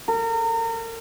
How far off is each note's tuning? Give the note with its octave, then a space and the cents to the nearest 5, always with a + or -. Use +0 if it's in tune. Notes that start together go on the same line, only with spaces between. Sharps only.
A#4 -35